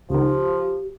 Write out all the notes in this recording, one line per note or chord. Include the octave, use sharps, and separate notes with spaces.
C#2 D#3 F3 G4